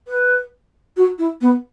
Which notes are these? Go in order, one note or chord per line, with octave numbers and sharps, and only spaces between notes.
B4
F#4
E4
B3